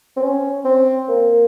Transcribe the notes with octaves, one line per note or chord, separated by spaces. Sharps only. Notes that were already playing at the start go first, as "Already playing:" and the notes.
C4
C#4
C4
A#3